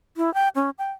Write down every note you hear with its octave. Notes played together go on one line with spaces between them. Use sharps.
E4
G5
C#4
G5